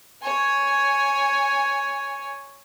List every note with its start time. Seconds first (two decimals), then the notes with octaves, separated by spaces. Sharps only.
0.22 C#5 G#5